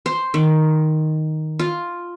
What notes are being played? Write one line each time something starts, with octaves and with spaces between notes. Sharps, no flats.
C5
D#3
F4